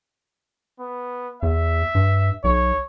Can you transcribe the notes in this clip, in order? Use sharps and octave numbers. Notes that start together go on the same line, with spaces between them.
B3
E2 E5
G2
B1 C#5